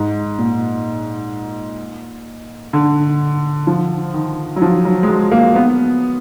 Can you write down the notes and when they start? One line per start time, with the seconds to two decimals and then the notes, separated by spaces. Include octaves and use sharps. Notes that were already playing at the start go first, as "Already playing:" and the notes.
Already playing: G#2
0.38 A#2
2.73 D3
3.67 F3
4.14 D#3
4.56 F#3
4.62 F3
4.85 F#3
5.03 G#3
5.09 F#3
5.31 A#3
5.55 B3